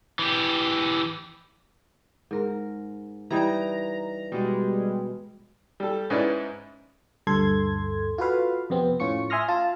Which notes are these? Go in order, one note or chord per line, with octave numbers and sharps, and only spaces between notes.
E3 G4
G#2 A#4
E3 G3 D#4 A#5
B2 G3 G#3
G3 A4
G#2 C#4 E4 B4 D5
D2 G2 A4 C6 G#6
F4 F#4 A4 B4 F5
F2 C3 B3 C4
A2 C#4 F4 C#6 C#7
E5 G#5 C6 D#6 F6 A#6
F4 F5 A5